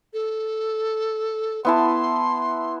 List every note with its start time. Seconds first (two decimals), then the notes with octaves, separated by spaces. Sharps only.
0.14 A4
1.65 B3 E4 A5 C6